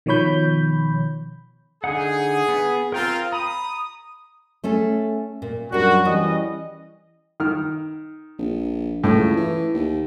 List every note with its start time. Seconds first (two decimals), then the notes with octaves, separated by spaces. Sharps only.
0.06 B2 D#3 F3 C#5 B5 G6
1.84 D3 D#4 G#4 F#5
2.48 B3
2.92 C4 F4 A#4 G5 A#5
3.32 A#5 B5 D#6
4.64 A3 C#4 A4
5.42 A#2
5.72 F#2 G3 D4 F#4 A#4
6.05 E3 G3 C#4 D#5
7.40 D#3 F6
8.38 A#1
9.04 C#2 A2
9.37 E3
9.74 D#2